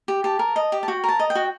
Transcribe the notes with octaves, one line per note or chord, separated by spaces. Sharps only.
G4
G4 A5
A#4
D#5
G4
A5
F#4 G5
A#4 A5
D#5
G5
F#4